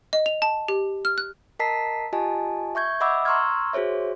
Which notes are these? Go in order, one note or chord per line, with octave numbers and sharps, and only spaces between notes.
D#5
F7
A5
G4
F6
F#6
A#4 D#5 A5 A#5 B6 C7
F4 G4 D#5 G#5 A5
E5 C#6 G6 G#6
D#5 E5 F#5 B5 D6 E6
A#5 C6 C#6 E6 F6 G#6
F#4 G#4 C5 C#5 E5